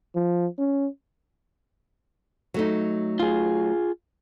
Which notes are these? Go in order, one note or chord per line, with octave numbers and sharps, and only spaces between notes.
F3
C#4
F#3 A3 D#4
F4 G#4